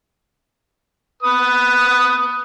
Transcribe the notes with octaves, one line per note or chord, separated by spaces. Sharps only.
B4 D#6